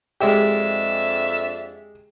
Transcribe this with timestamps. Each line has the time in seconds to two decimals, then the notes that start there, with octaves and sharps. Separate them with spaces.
0.20 F2 G#3 D4 G4 E5